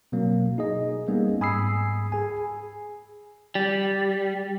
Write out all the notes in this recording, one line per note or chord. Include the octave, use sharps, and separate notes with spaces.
B2 F#3 A#3 C4
D#4 G#4 D#5
G3 A#3 B3 C#4 G#4
G#2 G#5 B5 D#6 E6 C7
G#4 G#5
G3